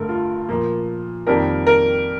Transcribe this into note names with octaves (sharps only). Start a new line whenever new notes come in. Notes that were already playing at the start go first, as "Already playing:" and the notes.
Already playing: G2 D3 A3 A4 A#4
F4
A#2 F3 A#3
F2 D#3 G3 A#3 A#4
A#4